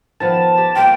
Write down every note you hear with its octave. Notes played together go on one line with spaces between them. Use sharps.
D#3 F3 B3 A5
G4
A#3 F4 G5